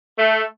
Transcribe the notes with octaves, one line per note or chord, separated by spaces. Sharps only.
A3